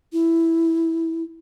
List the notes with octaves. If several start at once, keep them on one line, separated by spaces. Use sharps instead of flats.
E4